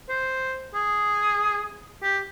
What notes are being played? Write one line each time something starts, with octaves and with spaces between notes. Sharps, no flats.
C5
G#4
G4